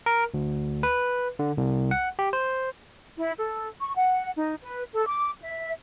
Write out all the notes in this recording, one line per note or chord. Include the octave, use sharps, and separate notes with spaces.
A#4
D2
B4
D3
C2
F#5
G4
C5
E4
A4
C#6
F#5
D#4
B4
A4
D6
E5